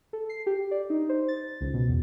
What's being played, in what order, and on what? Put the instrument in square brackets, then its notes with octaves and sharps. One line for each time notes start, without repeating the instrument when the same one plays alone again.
[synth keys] A4
C7
G4
D5
D#4
C5
A6
C#2
B2
E2